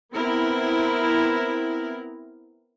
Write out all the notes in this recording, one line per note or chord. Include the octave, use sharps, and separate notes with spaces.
B3 C4 E4 A#4